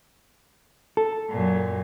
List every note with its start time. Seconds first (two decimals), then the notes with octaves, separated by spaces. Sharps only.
0.97 A4
1.31 F#2 A#2